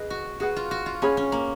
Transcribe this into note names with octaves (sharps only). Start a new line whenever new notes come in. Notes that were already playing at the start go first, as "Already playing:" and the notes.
Already playing: G#4 B4 D#5
F#4
F#4 G#4 B4 F#5
F4
F#4
F4
C#4 G#4 C#5 G#5 B5
C#4
A#3